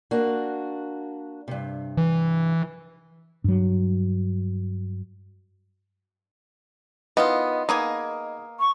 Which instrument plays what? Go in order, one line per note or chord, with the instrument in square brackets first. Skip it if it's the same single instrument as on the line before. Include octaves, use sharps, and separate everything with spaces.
[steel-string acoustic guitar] A#3 D4 F#4
G2 C3
[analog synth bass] E3
[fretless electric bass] G2 F#3
[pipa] D#3 E3 F4 [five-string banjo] B3 [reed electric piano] D#5
[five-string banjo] A#3 [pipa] B3 D#4 G#4
[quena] C#6